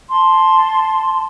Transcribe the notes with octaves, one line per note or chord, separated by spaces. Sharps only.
A5 C6